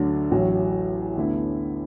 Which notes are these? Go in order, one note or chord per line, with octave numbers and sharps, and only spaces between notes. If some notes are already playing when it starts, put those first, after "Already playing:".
Already playing: D2 D3 F#3 D4
A1 A2 F#3
D2 D3 B3 E4